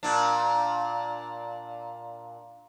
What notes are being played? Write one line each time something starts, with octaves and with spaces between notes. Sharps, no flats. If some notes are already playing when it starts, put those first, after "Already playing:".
A#2 D4